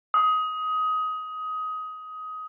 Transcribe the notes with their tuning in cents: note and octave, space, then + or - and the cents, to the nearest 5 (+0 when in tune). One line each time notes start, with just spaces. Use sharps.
D#6 +20